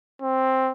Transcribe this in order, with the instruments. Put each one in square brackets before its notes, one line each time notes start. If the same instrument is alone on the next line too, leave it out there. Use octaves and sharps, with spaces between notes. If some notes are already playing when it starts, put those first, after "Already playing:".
[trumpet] C4